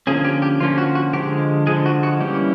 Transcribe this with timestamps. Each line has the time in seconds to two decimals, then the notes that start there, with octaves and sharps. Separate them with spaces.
0.07 D3 F3 A#3 C#4 G#4
0.24 G4
0.42 G4
0.60 D3 F3 A#3 C#4 F4
0.78 F#4
0.95 F#4
1.13 D3 F3 G#3 G4
1.67 D3 F3 G#3 G#4
1.86 F#4
2.03 F#4
2.20 E3 G3 A#3 C#4 G4